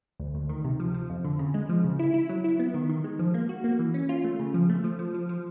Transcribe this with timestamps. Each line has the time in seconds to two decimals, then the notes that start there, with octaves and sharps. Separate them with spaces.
0.20 D2
0.35 D2
0.49 D#3
0.65 C3
0.80 F3
0.94 F3
1.10 F2
1.24 D3
1.39 C#3
1.54 G#3
1.69 F3
1.84 C#3
1.99 E4
2.14 E4
2.29 F#3
2.44 E4
2.59 B3
2.74 D#3
2.89 D#3
3.04 G#3
3.19 F3
3.34 A#3
3.49 F#4
3.64 A#3
3.79 E3
3.94 C#4
4.09 F4
4.24 A3
4.39 C#3
4.54 F3
4.70 A3
4.84 F3
4.99 F3
5.14 F3
5.29 F3